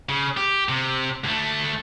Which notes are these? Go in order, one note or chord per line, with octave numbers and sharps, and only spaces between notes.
C#3
G4
C3
D2 A3